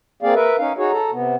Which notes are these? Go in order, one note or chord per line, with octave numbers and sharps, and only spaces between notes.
A#3 C4 G#4 D5 F5
A#4 B4 E5
C#4 D#4 F5
D#4 F#4 G#4 C#5
A4 A#5
C3 B3